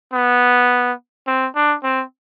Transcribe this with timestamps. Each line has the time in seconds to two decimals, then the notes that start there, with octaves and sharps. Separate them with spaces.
0.13 B3
1.27 C4
1.56 D4
1.83 C4